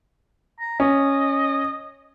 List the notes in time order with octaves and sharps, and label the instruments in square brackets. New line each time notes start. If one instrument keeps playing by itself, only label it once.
[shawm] A#5
[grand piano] C#4 [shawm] D#5